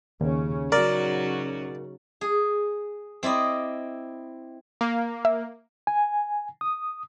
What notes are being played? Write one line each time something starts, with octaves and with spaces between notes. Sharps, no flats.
D#2 C#3 C#4
C#3 F#3 C#4 D#4 F#4 A#4 D5
G#4
C4 E4 D5 D#5
A#3
E5
G#5
D#6